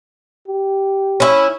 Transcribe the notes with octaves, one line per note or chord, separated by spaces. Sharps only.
G4
C#4 E4